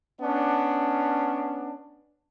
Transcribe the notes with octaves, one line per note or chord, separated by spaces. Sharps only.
B3 C#4 D4